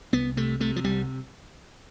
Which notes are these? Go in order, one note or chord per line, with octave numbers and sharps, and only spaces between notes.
C2 B3
C3 A3
C3 A3
F3
C2 G3